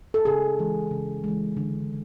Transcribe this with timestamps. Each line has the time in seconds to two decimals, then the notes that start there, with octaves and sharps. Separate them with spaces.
0.14 A4
0.25 C#3 G#4
0.59 E3 G#3
0.91 C#3
1.24 E3 G#3
1.57 D3